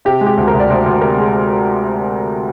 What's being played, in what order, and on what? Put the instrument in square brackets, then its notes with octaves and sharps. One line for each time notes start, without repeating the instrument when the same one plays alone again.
[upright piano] C3 G4
G#3
G4
D2
A#4
D2
D5
D2 C5
D2
C3 A#4
G#3